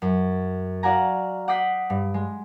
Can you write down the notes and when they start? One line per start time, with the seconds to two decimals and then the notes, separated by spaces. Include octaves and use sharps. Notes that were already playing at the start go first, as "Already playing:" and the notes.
0.02 F#2
0.83 F#4 D5 F5 F#5 G#5 A#5
1.48 F#5 D6 D#6 G6 B6 C7
1.90 G2
2.14 G#3